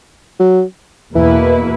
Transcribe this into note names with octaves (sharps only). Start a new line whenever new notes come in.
F#3
E2 B2 E3 A#3 E4 B4